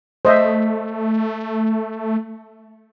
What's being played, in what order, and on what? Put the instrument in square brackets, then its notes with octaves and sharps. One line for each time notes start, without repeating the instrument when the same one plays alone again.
[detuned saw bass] A3 [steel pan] C5 D#5 E5